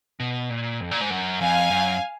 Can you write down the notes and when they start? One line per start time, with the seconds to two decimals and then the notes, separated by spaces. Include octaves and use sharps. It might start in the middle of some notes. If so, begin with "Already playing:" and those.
0.20 B2
0.50 A#2
0.81 F2
0.91 A#2
1.01 G#2
1.10 F#2
1.40 F2 F5 G#5
1.71 F#2